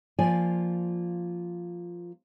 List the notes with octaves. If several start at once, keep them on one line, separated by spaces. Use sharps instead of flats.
F3 A#3 F4 D5 G#5